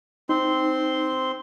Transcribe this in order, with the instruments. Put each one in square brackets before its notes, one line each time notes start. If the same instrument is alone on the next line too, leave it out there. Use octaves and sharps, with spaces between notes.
[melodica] C4 C6 [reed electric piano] D#4